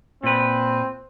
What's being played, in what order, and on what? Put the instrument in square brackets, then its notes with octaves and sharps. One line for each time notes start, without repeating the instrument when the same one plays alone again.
[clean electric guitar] A#2 B4 [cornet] C4